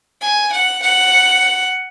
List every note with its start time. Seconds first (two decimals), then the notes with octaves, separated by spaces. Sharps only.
0.21 G#5
0.53 F#5
0.82 F#5